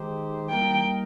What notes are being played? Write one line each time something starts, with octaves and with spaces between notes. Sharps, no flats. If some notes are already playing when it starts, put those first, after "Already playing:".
Already playing: D#3 G#3 D#4 G4 C5
G3 A#3 D#4 A#4 G5